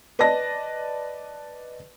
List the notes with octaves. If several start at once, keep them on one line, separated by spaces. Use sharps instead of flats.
B4 D5 D#5 A5 A#6